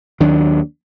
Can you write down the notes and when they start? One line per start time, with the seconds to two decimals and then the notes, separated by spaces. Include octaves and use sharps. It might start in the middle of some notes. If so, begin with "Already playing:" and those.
0.20 D#2 D#3 F#3 D4